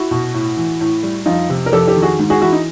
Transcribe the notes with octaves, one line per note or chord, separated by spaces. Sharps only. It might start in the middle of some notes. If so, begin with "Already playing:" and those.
Already playing: E4 F#4
B2
A2
E3
A2
G3
F2 D#4 F4
C3
A#4
F2 G4 A4
G4 A4
D#3
F#4 G#4
G#2
F#4 G#4
E3 E4 F#4
D#4